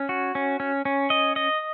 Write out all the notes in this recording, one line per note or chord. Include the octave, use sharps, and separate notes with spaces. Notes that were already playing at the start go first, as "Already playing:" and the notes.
Already playing: C#4
F#4
C#4
C#4
C#4
D#5
D#5